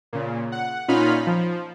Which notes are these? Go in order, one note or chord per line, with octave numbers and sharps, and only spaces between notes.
A#2 C#3
F#5
A#2 C#4 D#4 F4 B5 F6
F3